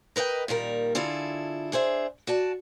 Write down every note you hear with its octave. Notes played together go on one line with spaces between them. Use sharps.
A#4 B4 D#5 F5 G5
A#2 D#3 G3 A#4
D3 E4 F4 G#4 A4
D4 G#4 C5 E5
F#4 D5 A5